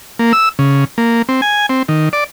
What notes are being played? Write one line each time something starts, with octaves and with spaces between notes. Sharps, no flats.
A#3
E6
C#3
A#3
C4
G#5
C4
D#3
D5